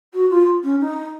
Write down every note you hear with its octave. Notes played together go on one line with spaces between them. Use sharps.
F#4
F4
C#4
D#4